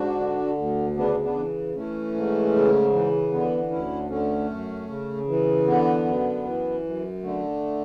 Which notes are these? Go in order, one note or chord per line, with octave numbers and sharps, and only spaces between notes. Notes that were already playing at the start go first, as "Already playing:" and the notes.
Already playing: G#2 D4 F#4
D3
D2
C#3 B3 D4
B3 D4
E3
E3 A3 C#4
G#2
C#3
E3
D3 B3
D2 C#4 E4
D3 A3 C#4
F#2
C#3
E3
D3 B3
F#2
E3
F#2
D3 A3